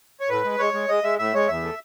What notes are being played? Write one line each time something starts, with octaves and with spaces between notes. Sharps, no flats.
C#5
A2 B4
G#3
G#3 C#5
G#3
G#3 D#5
G#3 E5
A2 E5
G#3 C#5
E2 E5
A3